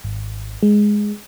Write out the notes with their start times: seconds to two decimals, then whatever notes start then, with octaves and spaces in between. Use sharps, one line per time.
0.04 G#1
0.63 G#3